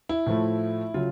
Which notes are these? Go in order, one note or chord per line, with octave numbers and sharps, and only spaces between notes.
E4
A2 F3 A3
C#3 F#3 F4